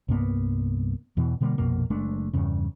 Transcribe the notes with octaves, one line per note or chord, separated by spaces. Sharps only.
C2 G2 A#3 B3
E2 B2 E3
B2 D3 G3 A#3
A#1 F2 B2 A#3
F#1 G#3 A3 D4
E2 G2 C#3